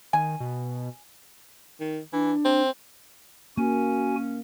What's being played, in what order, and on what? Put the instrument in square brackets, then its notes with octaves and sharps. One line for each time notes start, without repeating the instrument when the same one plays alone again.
[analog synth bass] D#3 [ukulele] G#5
[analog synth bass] B2
[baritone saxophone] D#3
[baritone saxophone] E3 [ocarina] D4
[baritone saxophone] C4
[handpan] A#3 [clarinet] C#4 [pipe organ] F#4 G#5